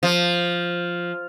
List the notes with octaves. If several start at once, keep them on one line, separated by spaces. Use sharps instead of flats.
F3